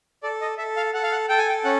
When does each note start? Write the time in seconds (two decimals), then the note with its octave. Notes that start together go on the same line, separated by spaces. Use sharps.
0.23 A4 D5
0.41 D#5
0.58 A4 E5
0.77 F5
0.94 A4 F#5
1.03 F5
1.12 F#5
1.29 A4 G5
1.38 G#5
1.49 G5
1.64 C#4 F#5